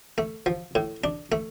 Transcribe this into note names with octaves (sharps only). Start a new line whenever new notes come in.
A3
F3
A2
D4
A3